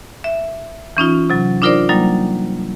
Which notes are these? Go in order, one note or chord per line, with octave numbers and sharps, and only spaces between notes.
E5
E3 C#4 D#4 F4
C3 F#3
D4 D#4 F4 A#4 C5 D5
F#3 G3 A#3 D#4